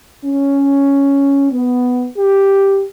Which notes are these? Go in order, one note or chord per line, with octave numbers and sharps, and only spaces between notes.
C#4
B3
G4